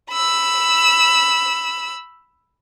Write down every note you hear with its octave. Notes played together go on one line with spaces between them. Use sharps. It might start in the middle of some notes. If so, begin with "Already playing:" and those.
B5 E6